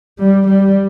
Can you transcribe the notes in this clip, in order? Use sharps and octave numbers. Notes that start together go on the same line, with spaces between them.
G3
G3